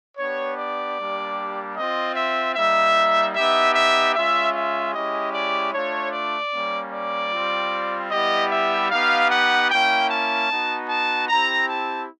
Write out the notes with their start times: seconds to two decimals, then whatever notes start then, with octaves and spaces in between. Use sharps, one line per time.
0.18 B3 D4 G4 C#5
0.57 D5
0.96 G3 A#3 D4 G4
1.76 C4 F4 D#5
2.16 E5
2.56 G3 A#3 D#4 E5
3.35 B3 D#4 G4 E5
3.75 E5
4.14 G#3 C#4 F4 E5
4.54 E5
4.94 G#3 C#4 E4 G4 D#5
5.33 D5
5.73 A3 D4 F4 C#5
6.12 D5
6.53 G3 A#3 C#4
6.92 D5
7.32 G3 C4 F4
8.11 G3 B3 E4 G4 D#5
8.51 E5
8.90 B3 D#4 G4 F5
9.30 F#5
9.70 A#3 C#4 E4 G5
10.09 A5
10.49 B3 D#4 F#4
10.89 A5
11.28 C4 E4 G4 A#5
11.68 A5